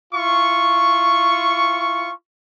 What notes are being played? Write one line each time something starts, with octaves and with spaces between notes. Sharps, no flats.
E4 F4 C#6